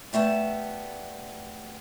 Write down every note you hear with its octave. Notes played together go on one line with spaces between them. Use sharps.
G3 A3 B3 A5